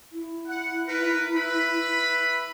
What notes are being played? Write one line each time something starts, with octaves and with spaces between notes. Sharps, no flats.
E4
F#5
A#4 B4
B4 E5 B5